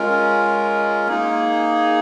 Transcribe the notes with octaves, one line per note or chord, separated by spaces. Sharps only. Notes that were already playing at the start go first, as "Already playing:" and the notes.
Already playing: G#3 C#4 F4 A#4
A#3 D#4 G#4